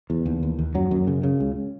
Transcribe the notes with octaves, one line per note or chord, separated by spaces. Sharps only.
E2
D#2
D#2
D#2
F#2 F#3
F#2
C#3
C#3
C#2